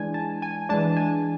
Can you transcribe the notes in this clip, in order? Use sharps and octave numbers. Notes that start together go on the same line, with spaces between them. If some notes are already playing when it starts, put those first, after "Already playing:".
Already playing: E3 G#3 D4 G#5
A5
G#5
E3 G#3 D4 A5
G#5